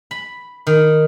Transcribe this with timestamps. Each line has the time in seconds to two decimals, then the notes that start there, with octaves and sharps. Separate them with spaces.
0.11 B5
0.67 D#3